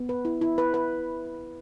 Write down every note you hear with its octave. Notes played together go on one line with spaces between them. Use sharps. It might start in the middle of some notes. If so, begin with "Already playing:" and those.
Already playing: B3
B4
E4
E4
B4
B4